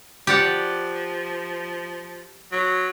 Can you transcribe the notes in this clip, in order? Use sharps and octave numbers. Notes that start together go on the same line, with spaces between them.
F3 G4 D5 F#5
F#3